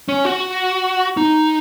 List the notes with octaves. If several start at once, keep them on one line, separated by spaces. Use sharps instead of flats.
C#4
F#4
D#4